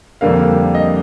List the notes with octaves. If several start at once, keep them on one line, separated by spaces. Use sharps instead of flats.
F2 D3 G3 A#3 F5
D#5